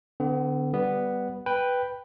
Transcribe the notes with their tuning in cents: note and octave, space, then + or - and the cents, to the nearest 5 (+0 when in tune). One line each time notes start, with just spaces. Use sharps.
D3 +0 B3 +45
G3 +0 B3 +0
B4 +0 G5 +5